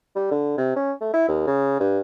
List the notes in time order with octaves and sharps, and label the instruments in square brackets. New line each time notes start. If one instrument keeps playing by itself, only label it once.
[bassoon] G3
D3
C3
C#4
A3
E4
D#2
C#3
G2